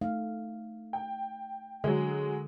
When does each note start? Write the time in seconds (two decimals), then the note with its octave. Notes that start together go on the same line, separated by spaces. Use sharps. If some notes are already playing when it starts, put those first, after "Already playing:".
0.01 A3 D#4 F5
0.93 G5
1.84 D3 F#3 G#3